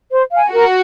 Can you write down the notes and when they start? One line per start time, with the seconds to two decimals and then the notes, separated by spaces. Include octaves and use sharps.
0.11 C5
0.32 F5 G#5
0.52 F#4 A#4